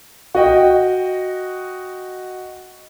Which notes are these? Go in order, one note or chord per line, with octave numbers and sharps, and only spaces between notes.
F#4 D#5 G5